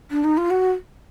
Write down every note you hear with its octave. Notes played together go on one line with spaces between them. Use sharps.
D4
D#4
F4
F#4